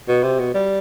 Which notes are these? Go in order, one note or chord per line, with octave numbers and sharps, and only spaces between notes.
B2
C3
B2
G3